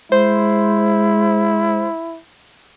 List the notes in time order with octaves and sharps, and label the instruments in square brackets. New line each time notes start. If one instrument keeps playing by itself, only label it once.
[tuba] G#3 [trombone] E4 [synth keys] C5